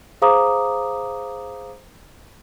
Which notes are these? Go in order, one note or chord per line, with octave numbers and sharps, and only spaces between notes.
G#4 C5 F5 A#5 D6 D#6